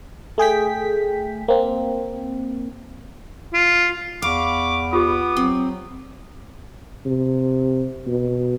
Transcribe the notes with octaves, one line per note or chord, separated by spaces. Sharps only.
A3 G#4 G5 B6
A#3 C4
F4
E2 F5 B5 C#6 D6
B3 F4 G4 D6 D#6
F#3 C4
C3
B2